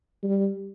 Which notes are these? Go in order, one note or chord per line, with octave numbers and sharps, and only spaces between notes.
G3